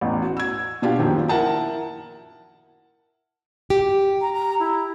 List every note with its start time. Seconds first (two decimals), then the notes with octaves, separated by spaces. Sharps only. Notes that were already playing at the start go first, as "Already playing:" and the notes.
0.01 A1 E2
0.22 F#4
0.37 E6 G#6
0.82 B2 D4 F4 G4
0.99 F#2 A#2 D#3 F3
1.28 E4 A#4 F#5 A5 A#5
3.70 G4
4.21 A#5
4.33 A#5
4.60 E4